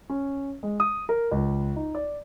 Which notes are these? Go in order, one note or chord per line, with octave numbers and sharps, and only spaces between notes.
C#4
G#3
D#6
A#4
C#2
D#4
D5